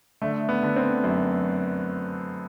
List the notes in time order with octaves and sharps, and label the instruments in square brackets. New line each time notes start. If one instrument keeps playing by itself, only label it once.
[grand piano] D3 A3
B3
D3
C4
F#2